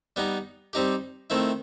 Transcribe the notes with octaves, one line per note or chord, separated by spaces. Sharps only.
G3 B3 D#4
G3 C4 D#4 G4
D#3 A3 C4 E4